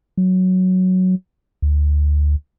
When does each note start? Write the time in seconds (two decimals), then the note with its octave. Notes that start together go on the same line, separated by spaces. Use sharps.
0.17 F#3
1.62 D2